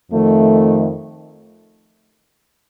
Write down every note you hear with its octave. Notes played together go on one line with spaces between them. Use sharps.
F2 D#3 A3